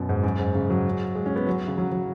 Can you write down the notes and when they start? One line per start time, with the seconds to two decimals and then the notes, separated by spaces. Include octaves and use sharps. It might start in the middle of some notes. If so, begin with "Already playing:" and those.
Already playing: F#2 B2
0.09 G#2
0.24 F#2
0.39 G#2
0.55 C#3
0.70 F#3
1.15 G#3
1.26 C#4
1.36 B3
1.47 F#3
1.68 C#3
1.78 F#3
1.92 F#3